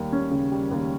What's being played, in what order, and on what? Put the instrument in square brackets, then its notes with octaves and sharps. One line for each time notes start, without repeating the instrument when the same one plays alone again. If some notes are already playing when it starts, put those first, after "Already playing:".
Already playing: [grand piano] D#2 G3
C#4
C#3
G3
D#2